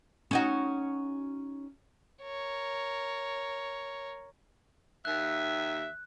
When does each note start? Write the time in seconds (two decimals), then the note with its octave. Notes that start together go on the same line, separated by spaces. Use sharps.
0.31 C#4 D#4 F#4
2.22 A#4 C#5
5.05 D#2 E5 F#6